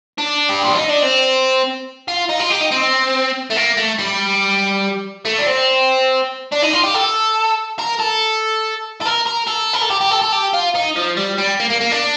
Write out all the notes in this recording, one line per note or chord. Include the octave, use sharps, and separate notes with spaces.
D4
G4
F4
D#4
D4
C4
F4
D#4
F4
G4
D#4
C4
A3
A#3
A3
G3
A3
D4
C4
D4
D#4
F4
G4
A4
A#4
A4
A4
A#4
A#4
A4
A#4
A4
G4
G4
A4
A4
G4
F4
D#4
F3
G3
G3
A#3
A#3
A#3
D4